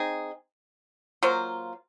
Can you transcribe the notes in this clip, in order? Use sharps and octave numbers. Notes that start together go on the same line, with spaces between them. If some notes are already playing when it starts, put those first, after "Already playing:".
Already playing: C4 D#4 G#4
F#3 A#3 F4 C5